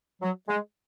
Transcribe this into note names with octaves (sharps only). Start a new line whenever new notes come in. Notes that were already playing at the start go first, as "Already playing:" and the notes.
F#3
G#3